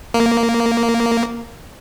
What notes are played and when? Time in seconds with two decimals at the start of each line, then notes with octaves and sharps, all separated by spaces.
0.14 A#3